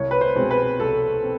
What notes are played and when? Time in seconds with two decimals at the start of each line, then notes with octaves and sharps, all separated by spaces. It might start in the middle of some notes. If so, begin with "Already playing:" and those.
Already playing: C2 C#5
0.11 B4
0.21 C5
0.35 B2 G#3 C4
0.51 B4
0.79 C2 A4
1.23 C4